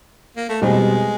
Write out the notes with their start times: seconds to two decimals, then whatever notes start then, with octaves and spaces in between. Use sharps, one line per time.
0.36 A#3
0.49 A3
0.62 E2 B2 G3 G#3 C4